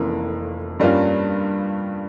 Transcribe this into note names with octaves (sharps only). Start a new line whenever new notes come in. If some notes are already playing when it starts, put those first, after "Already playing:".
Already playing: F1 F2 E3 A#3 C#4
G2 G3 A#3 C#4 F4